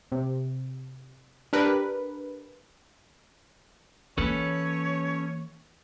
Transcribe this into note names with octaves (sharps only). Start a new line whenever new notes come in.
C3
D4 G4 A#4 B4
E3 A#3 C#4 A4 B4 C#5